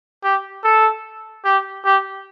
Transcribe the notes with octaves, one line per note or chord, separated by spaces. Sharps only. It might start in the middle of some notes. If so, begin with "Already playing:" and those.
G4
A4
G4
G4